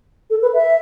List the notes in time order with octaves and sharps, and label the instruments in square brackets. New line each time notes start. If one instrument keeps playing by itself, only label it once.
[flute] A4
B4
E5